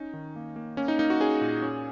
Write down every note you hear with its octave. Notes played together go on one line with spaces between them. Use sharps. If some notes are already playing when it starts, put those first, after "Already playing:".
Already playing: C#4 D#4
D#3
A#3
A#3
A#3 C#4
D#4
A#3 D#4
F#4
C#4 G#4
A#2
C#4